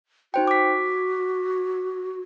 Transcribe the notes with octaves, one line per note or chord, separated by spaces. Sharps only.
D#4 F#4 C5 G5
D6 B6